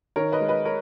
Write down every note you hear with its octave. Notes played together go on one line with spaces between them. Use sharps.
D#3 A#4 C#5
B4 D#5
G#3
B4 D#5
A#4 C#5